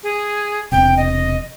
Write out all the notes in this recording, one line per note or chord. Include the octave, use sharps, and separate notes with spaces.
G#4
E1 C3 G5
D#5